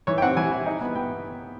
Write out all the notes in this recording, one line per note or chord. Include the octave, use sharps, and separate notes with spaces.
E3 C#5
G5
C4 F#5
E3 G#5
E4
D#4
B3
B3 G5